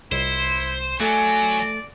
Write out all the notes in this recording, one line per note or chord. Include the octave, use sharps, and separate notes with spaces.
C2 E4 C5
F#3 A3 A4 D5 G#5